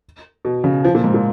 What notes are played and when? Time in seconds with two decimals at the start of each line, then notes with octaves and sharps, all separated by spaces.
0.45 B2
0.64 C#3
0.85 F3
0.95 A#2
1.04 G#2
1.14 A#2